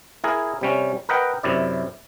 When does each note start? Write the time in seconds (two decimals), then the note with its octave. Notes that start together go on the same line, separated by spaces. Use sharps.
0.24 E4 G#4 A#4
0.61 C3 G3 C#4
1.09 A#4 B4 D#5 F#5 G5
1.43 F#2 C3 E4 D5